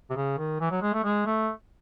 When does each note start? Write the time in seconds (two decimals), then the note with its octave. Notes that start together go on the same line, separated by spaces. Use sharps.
0.10 C3
0.16 C#3
0.38 D#3
0.60 E3
0.71 F#3
0.82 G#3
0.94 A3
1.04 G#3
1.26 A3